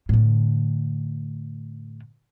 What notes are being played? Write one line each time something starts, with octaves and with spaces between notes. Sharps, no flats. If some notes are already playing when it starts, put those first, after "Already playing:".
A2 D3